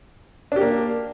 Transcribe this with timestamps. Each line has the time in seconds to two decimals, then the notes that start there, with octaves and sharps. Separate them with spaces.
0.52 D4
0.56 G4
0.61 A#3